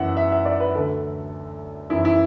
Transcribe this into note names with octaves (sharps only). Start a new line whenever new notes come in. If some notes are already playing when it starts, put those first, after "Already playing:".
Already playing: F#2 E3 E5 F#5
E5
E5
D5
B4
D2 D3 A4
F#2 E3 E4
E4